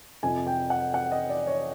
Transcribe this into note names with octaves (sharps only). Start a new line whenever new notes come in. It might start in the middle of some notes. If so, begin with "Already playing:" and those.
F2 C3 F3 G#5
G5
F#5
F#5
D#5
D5
C#5